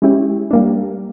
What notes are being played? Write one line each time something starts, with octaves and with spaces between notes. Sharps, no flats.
G#3 C#4 E4 G4
G3 A#3 D4